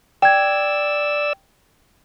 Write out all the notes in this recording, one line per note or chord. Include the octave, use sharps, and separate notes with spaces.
D5 G5 E6 G#6